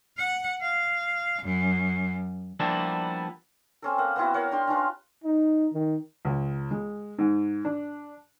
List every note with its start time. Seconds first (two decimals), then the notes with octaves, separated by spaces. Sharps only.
0.17 F#5
0.61 F5
1.42 F#2
2.60 F3 G3 A#3 B3 D4 E4
3.82 C4 C#4 A4
3.98 A#3 F#5
4.16 B3 C4 E4 F#4
4.34 A#4 C#5 F5 F#5
4.51 D4 G4 C6
4.67 C#4 D4 F4 B4
5.24 D#4
5.73 D#3
6.25 C#2
6.71 G#3
7.19 G#2
7.65 D4